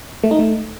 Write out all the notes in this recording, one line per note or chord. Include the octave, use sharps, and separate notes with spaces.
A3
D#4
A3